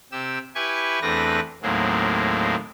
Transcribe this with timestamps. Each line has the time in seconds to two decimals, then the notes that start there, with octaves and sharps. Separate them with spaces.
0.12 C3 G4 E6
0.55 E4 G4 B4 G#5 C#6
1.02 E2 A3 C4 D4 B4 A#6
1.62 D#2 A2 F#3 G#3 A#3 C4